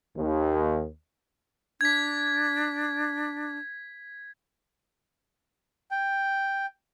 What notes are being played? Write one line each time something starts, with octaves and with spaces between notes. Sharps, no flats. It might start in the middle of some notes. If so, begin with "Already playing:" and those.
D#2
D4 G#6 B6
G5